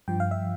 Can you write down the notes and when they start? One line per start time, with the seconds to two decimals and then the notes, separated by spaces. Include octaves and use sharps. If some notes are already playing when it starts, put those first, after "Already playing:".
0.08 G2 F3 G5
0.20 F5
0.31 E5